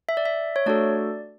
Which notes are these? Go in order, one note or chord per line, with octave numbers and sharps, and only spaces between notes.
E5
D5
E5
C#5
A3 D4 F#4 A4 D5